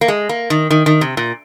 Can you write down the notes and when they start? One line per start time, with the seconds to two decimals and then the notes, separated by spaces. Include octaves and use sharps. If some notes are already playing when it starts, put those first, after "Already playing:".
0.01 A#3
0.08 G#3
0.29 A#3
0.50 D#3
0.71 D#3
0.86 D#3
1.01 C3
1.17 A#2